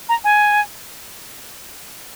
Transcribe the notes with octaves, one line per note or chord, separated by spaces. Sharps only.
A#5
G#5